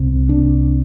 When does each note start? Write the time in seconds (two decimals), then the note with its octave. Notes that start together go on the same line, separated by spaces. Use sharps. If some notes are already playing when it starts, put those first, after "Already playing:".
Already playing: C2 C3
0.29 D4